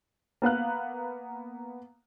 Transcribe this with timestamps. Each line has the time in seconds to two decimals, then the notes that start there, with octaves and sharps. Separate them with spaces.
0.42 A#3 B3 F5 F#6